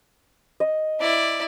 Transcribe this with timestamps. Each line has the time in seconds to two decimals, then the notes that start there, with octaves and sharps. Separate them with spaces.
0.60 D#5
1.00 E4 D5